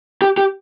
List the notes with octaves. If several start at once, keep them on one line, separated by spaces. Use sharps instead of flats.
G4
G4